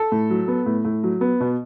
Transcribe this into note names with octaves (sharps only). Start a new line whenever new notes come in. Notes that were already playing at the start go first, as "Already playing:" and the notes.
Already playing: A4
A2
F#3
B3
A2
A2
F#3
B3
B2